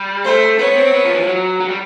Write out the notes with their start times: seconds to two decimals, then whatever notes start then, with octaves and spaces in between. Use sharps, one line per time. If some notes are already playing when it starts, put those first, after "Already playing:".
Already playing: G3
0.25 A3 C5
0.59 B3 C#5
0.76 C4
0.93 B3
1.04 F3
1.15 E3
1.21 F3
1.26 F#3
1.60 F#3
1.69 G3